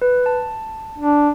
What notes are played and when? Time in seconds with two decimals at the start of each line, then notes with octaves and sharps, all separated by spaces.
0.02 B4
0.26 A5
0.98 D4